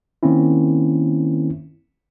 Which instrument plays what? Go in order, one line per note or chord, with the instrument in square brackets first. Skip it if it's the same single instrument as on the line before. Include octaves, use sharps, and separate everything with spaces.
[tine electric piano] D#3 A#3 C4 C#4 E4